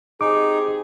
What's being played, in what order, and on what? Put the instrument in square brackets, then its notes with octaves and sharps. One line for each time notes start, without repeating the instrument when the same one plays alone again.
[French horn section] C4 G4 G#4 [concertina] D#4 [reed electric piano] D6